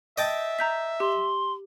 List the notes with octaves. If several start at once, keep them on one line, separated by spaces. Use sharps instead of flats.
D#5 E5 G5 A5
A#5 G6 B6
G4 C6